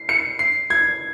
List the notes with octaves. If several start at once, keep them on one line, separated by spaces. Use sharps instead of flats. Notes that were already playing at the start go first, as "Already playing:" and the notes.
Already playing: C7
C#7
C7
G#6